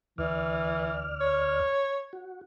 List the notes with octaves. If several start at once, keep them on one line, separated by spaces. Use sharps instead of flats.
D2 E3 D5 F6
C#5
F#4